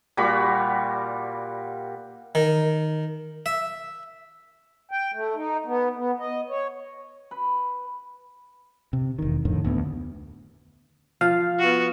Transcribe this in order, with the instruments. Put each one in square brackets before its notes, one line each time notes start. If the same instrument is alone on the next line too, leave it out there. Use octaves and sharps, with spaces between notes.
[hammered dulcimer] A#2 G3 F#4 B5
[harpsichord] D#3
E5
[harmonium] G5
A3
D#4
B3
B3
D#5
C#5
[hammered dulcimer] B4
[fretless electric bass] C3
E1 D#3
F2 A2 D3 D#3
D2 B3
[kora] F3 [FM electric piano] F5
[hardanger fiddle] B3 F#4